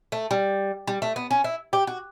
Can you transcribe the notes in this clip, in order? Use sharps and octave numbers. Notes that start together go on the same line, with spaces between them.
A3
G3
G3
A3
B3
C#4
E4
G4
F#4